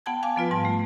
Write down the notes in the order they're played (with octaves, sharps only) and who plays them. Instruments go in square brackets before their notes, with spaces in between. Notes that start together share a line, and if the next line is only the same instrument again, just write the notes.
[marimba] B3 F#5 G5 A5 G#6
F5 G#5 A5 D6
F3 B3 F4 B4
G#2 G3 A5
A3